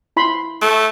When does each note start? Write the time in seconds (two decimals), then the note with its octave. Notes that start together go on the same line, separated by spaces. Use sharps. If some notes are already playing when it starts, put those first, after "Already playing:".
0.16 E4 B5 C6
0.61 A3